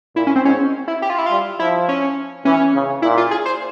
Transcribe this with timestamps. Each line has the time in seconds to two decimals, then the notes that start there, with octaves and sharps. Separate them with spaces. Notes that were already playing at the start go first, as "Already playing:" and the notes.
0.16 A#2 E4
0.27 C#4
0.36 C4
0.45 G#2 C#4
0.88 E4
1.02 G4
1.10 F4
1.18 E4
1.26 G3 F4
1.59 F3 E4
1.89 C#4
2.45 E3 C#4
2.75 C#3
3.02 A#2 E4
3.17 F4
3.31 G#4
3.46 C5